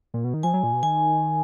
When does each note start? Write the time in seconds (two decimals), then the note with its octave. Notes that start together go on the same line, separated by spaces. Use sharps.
0.14 A#2
0.24 B2
0.34 D#3
0.43 F3 G#5
0.54 F#3
0.63 A#2
0.73 B2
0.83 D#3 G#5